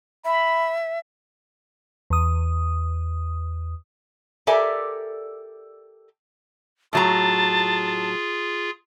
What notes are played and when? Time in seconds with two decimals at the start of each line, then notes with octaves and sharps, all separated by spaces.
0.25 E5 B5
2.10 E2 D#6
4.47 G4 A4 A#4 D5 E5 G#5
6.93 A2 F#3 F4 G#4 A5 A#5